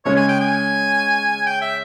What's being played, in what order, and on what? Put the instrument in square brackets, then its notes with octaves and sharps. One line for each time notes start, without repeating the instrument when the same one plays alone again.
[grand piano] C#3 G#3 C#4 [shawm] C#5
[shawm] G#5
G5
G#5
G5
E5